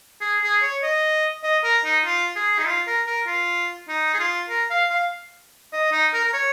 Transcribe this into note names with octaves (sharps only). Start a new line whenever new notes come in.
G#4
G#4
C#5
D#5
D#5
A#4
D#4
F4
G#4
D#4
F4
A#4
A#4
F4
D#4
G#4
F4
A#4
F5
F5
D#5
D#4
A#4
A#4
C#5